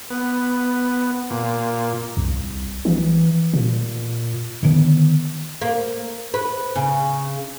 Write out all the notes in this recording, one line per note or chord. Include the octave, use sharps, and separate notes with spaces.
B3
A#2
C2
E3
A#2
D3 D#3 B3
A#3
B4
C#3